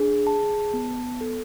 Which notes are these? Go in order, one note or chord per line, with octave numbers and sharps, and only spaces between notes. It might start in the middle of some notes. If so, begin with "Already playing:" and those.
Already playing: D4 G#4
A5
B3
A4